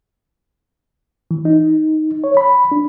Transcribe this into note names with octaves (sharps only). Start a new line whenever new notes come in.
E3
D#4
C#5
B5
D4